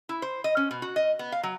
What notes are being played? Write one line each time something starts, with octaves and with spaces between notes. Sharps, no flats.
E4
C5
D#5
C#4
B2
F#4
D#5
B3
F5
F#3